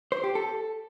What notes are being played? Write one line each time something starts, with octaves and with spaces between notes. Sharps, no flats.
C5
G4
A4